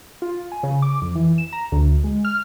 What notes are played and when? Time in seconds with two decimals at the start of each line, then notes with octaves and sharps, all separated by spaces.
0.22 F4
0.52 G#5
0.63 C#3
0.82 D6
1.02 F2
1.15 E3
1.38 E7
1.53 A#5
1.72 D2
2.04 G#3
2.25 F6